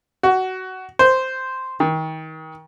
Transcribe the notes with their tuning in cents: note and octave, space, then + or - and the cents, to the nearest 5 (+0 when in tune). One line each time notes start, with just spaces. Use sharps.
F#4 +15
C5 -5
D#3 +30